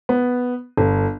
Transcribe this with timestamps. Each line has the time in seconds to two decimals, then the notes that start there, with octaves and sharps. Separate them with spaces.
0.09 B3
0.77 G1